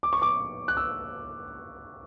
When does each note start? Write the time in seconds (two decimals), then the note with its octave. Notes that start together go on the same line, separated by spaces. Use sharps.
0.03 D6
0.13 C#6
0.22 D6
0.68 F#6
0.77 E6